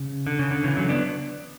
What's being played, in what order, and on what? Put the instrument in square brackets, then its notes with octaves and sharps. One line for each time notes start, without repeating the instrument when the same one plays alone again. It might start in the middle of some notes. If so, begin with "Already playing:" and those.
Already playing: [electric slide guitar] C#3
D3
C#3
D3
C#3 E3
D3 F#3
B3 D4